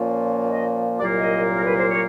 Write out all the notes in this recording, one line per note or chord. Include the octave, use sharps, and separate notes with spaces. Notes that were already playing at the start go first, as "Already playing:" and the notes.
Already playing: A#2 F3 A#3 C#4 F4
D#5
C2 A#2 F#3 A#3 D5
D#5
A#4
B4
C5
C#5